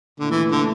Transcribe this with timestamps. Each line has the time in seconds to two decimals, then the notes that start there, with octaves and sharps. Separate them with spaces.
0.20 A#2 D3 A3 E4
0.31 E3
0.52 D3